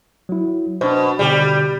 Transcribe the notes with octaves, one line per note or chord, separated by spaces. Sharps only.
F#3 E4
B2 D4 C5
B2 D3 G3